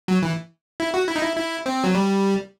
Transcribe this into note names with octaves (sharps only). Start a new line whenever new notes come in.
F#3
E3
E4
F#4
E4
D#4
E4
E4
C4
F#3
G3